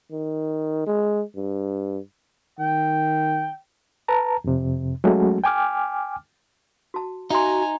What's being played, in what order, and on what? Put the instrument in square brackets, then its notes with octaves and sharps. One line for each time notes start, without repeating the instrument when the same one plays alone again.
[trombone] D#3
G#3
G2
[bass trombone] D#3 [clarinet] G5
[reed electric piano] B4 A5 A#5
F2 C3
F#3 G#3 A3 C#4 F#4
G5 G#5 D6 F6
[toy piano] F#4 A5
[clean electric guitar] D#4 [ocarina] F#4 [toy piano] E5 C6 [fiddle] G#5 A#5